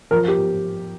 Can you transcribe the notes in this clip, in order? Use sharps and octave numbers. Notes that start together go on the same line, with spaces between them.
F3 A#4
G4